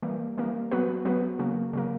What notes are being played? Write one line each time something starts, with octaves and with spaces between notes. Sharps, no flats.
E3 G3 A#3
E3 G3 A#3
F#3 B3 F#4 B4
F#3 B3 F#4 B4
C#3 F#3 A#3
C#3 F#3 A#3